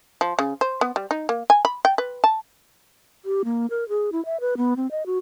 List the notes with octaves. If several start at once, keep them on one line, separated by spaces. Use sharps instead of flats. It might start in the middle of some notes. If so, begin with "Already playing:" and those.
F3
C#3
C5
B3
G3
D#4
A#3
G#5
B5
G5
B4
A5
G4
A#3
A#4
G#4
E4
E5
B4
B3
C4
D#5
F#4